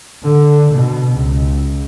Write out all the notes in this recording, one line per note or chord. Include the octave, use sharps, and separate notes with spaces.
D3
B2
C#2